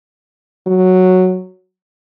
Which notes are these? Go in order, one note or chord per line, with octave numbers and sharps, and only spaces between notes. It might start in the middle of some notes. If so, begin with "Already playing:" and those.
F#3